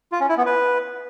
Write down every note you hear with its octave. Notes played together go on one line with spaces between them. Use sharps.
F4
C#4
E4
B3
B4